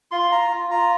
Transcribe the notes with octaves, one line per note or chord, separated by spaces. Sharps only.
F4 C6
F4 A#5
F4
F4 A#5